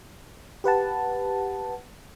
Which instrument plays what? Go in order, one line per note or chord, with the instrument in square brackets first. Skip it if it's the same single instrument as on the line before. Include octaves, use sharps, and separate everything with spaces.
[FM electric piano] G4 B4 F#5 A5